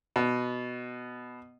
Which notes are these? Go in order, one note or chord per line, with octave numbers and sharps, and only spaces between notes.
B2